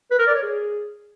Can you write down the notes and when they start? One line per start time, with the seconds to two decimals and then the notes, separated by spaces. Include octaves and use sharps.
0.11 B4
0.19 A#4
0.27 D5
0.35 C#5
0.43 G#4